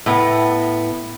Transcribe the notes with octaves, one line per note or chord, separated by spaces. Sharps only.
A2 B3